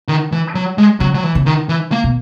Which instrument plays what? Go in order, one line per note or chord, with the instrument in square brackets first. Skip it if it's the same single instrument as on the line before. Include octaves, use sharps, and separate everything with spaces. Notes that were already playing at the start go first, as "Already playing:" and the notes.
[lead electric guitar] D#3
E3
F#3
G#3
[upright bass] C#3 [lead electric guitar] F#3
[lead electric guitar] F#3
E3
[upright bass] C#3
[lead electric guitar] D#3
E3
A#3
[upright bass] B2